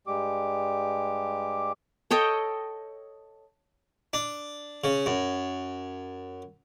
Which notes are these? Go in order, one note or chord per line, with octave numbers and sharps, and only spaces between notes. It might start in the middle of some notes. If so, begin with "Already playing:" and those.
G2 G3 G#3 G4 D6
A4 C#5 D#5 G5
D4
C#3
F#2